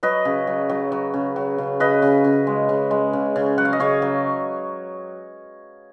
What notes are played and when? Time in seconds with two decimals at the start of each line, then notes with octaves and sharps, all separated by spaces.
0.03 F#3 B4 D#5
0.25 C#3
0.47 F#3
0.69 F#3
0.92 F#3
1.14 C#3
1.36 F#3
1.58 C#3
1.80 C#3 B4 D#5
2.02 C#3
2.24 C#3
2.47 G#3
2.69 C#3
2.91 G#3
3.13 C#3
3.36 C#3
3.58 F#3 F#5
3.65 F5
3.73 D#5
3.80 C#3 C#5 F5
4.02 F#3